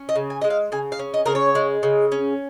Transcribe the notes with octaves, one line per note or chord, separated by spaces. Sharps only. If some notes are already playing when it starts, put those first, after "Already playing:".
Already playing: C#4
D#5
C#3
G#5
G#3 D#5
F5
C#3 G#5
F5
C#4
D#5
C#3 A#4
C#5
G#3
C#3
C#4